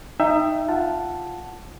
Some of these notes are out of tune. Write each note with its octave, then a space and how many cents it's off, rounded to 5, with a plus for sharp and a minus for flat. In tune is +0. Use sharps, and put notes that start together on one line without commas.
D#4 +0 E5 +25 G5 +0
F4 +0 F#5 +0 A5 +0